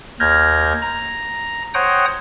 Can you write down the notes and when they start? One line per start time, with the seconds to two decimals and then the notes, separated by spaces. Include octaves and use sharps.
0.20 D#2 F6 G6 G#6 A#6
0.82 A#5
1.74 C5 C#5 F#5 G5 A#5 D#6